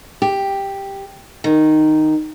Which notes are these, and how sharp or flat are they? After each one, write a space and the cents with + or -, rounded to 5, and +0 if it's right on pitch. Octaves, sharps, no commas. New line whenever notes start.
G4 +5
D#3 -5